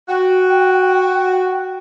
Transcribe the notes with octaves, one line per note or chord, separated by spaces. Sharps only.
F#4 G5